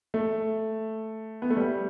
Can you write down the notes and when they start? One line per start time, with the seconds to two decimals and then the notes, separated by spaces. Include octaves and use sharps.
0.14 A3
1.42 B3
1.50 A3
1.57 G3